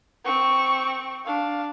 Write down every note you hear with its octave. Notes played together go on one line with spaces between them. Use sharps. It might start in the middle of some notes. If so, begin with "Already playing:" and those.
C4 C#6
D4 F5